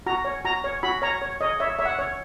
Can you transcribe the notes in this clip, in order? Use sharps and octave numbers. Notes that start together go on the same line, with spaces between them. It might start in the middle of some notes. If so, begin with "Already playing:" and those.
F#4 A#5
C#5
F#4 A#5
C#5
F#4 B5
C#5 A#5
C#5
C#5 D#5
C#5 E5
C#5 E5
F#5
C#5